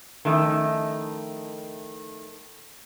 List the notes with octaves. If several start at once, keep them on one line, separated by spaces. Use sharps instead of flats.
D#3 F3 A3 C#4 D#4 E4